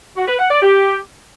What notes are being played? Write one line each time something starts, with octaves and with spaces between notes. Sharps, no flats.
F#4
B4
F#5
D5
G4